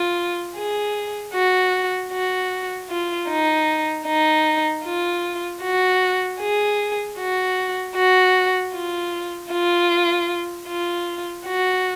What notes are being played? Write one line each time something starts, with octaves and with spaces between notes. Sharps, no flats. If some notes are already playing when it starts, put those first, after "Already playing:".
Already playing: F4
G#4
F#4
F#4
F4
D#4
D#4
F4
F#4
G#4
F#4
F#4
F4
F4
F4
F#4